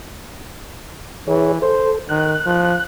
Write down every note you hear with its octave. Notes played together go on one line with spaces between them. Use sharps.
E3 G#4 C#5
A4 C5
D#3 F#6
F3